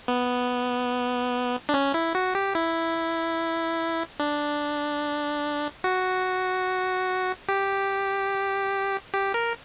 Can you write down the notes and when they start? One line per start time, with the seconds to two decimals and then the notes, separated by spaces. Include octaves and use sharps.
0.08 B3
1.69 D4
1.74 C#4
1.94 E4
2.15 F#4
2.35 G4
2.55 E4
4.20 D4
5.84 F#4
7.49 G4
9.14 G4
9.34 A#4